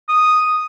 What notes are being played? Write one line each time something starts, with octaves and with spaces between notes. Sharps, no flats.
D#6